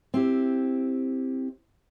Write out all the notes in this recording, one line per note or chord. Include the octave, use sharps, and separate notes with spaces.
C4 E4 G4